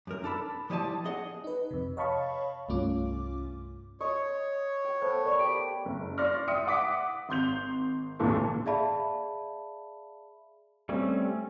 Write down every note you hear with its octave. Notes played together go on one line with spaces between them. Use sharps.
F#2 A#4
D4 A4 B5
F3 G3 E4 D#5 A5
G#4 D#5 F#5
D#4 B4
F2 C3
C#5 D#5 F5 A5 B5 C#6
C2 G2 A3 C#4 F4 D6
C#5 D#5 C#6
G5
A3 B3 C5
A#4 D5 C#6
G4 B5 D7
F#1
D5 C6 C#6 F6 A#6
D5 E5 G5 C6 D#6 C#7
F#5 D6 B6
G#1 C6 G6 F7
A1 D#2 A#2 D3 A4 C#6
G#4 D5 E5 F5 A5 B5
G3 A3 C4 C#4